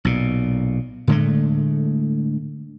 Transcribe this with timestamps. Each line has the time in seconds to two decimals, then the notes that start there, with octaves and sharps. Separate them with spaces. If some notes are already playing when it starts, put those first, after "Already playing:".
0.05 B1 A#2
1.07 A2 D3 G#3 A3